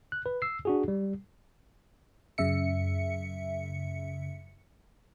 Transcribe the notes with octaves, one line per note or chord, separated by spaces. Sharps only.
F#6
B4
E6 C7
D4 F#4 G#4
G3
F#2 C#3 E5 C#7